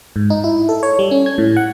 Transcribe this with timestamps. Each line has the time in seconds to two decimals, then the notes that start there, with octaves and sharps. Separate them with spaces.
0.16 G#2
0.30 D#4
0.44 E4
0.69 A4
0.83 C#5
0.99 G3
1.11 C#4
1.26 G#6
1.38 A2
1.56 F#5